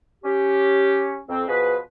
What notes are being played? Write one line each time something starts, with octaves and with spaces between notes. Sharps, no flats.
C#4 G4
F2 C4
B2 F3 G#4 B4